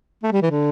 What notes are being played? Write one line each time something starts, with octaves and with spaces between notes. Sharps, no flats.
A3
G3
E3
D3